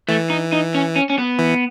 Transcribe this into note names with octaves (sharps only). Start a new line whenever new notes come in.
E3 A3
D#4
D#4
C#4
C#4
C#4
B3
E3